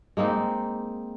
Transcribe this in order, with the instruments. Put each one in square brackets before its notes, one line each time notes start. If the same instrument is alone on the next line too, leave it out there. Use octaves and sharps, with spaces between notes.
[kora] G#3 A#3 C4 D#4